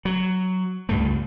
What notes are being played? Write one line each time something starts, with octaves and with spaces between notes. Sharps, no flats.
F#3
C#2 G2 A3